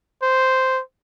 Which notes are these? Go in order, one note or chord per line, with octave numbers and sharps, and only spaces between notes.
C5